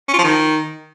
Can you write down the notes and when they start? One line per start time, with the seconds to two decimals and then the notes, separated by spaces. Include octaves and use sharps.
0.08 C#4
0.13 F4
0.19 F3
0.24 D#3